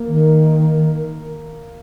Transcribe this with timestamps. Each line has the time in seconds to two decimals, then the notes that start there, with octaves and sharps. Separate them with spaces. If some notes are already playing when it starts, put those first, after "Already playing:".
Already playing: A#3
0.08 D#3